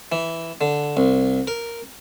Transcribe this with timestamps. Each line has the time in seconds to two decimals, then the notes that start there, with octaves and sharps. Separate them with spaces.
0.12 E3
0.61 D3
0.97 C2
1.47 A#4